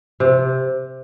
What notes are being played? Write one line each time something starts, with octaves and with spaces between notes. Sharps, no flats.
C3